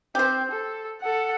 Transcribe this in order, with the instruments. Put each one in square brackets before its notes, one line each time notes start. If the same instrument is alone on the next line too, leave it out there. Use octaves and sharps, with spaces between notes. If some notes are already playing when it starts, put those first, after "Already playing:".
[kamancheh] C4 [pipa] G4 C5
[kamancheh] A4
A4 F#5